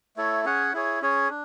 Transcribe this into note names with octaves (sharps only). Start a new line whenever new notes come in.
A3 E4 A4 C#5
C#4 G#4 C#5 F#5
E4 G#4 C#5
C#4 G#4 C#5
D4